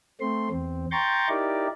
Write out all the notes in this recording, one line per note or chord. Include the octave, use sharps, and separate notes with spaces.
A3 C4 C6
E2 C4
G5 A#5 C6 C#6 G6 A6
D#4 E4 G4 A#4 D5